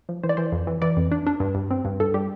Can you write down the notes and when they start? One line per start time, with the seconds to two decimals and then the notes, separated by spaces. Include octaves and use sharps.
0.09 F3
0.24 E3 C5
0.29 D5
0.37 E3 C5
0.52 F2
0.67 E3
0.82 E3 D5
0.97 F2
1.12 D4
1.27 D4
1.40 G2
1.55 G2
1.71 C4
1.85 G2
2.00 G2 A4
2.14 G3 G4